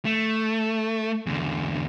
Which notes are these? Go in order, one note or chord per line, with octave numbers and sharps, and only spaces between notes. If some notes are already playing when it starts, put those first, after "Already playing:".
A3
E2 D3